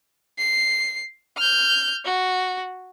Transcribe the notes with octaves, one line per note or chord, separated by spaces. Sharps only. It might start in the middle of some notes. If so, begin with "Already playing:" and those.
C7
F6 G6
F#4